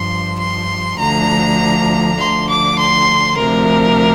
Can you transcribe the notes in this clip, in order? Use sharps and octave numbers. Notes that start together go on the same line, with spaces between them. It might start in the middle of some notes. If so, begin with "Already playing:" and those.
Already playing: G2 F3 C6
C6
D2 D3 F3 A#5
D2 D3 F3 C6
D6
C6
D2 C3 F3 A#4